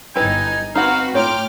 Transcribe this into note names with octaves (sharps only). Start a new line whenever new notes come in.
G1 D#4 E4 G4 B4 G#5
C4 D#4 F#4 B4 F5 F#5
A2 D#4 F4 C#5 G5 D6 F6